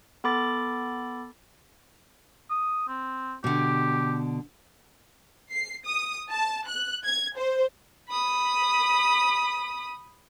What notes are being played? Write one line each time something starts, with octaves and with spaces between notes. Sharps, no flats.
B3 A4 B5 D6 A6
D#6
C4
B2 D3 G4
C7
D#6
A5
F#6
G#6
C5
B5 D#6